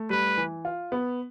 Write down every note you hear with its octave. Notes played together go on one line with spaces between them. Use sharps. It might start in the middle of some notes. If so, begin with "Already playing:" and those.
Already playing: A3
G3 B4
E3
F4
B3